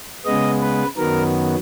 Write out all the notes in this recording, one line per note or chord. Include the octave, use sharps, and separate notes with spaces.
C#3 G#3 B3 D#5
B4
F#2 D#3 F#3 B3 A#4